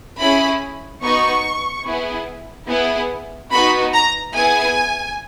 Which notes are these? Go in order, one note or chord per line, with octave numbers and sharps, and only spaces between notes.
C#4 E4 G#4 B5
B3 D#4 F#4 C#6
B3 E4 G#4
B3 E4 G#4
B3 D#4 F#4 B5
A#5
B3 E4 G#4 G#5